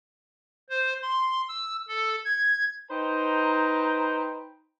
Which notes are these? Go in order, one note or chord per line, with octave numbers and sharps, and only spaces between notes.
C5
C6
E6
A4
G#6
D#4 B4 C5 G5 A#5